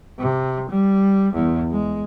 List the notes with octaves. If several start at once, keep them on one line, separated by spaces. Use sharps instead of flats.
C3
G3
E2
G#3